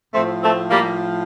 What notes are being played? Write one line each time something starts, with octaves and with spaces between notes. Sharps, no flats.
A2 F3 A3 C4
A3 C4
G3 A#3